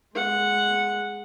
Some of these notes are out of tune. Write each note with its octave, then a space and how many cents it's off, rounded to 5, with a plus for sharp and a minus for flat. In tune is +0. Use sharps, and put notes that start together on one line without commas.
G#3 +0 F#5 -10